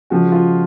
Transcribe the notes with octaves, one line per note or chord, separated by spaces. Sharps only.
C#3 F3 G#3 F#4
F4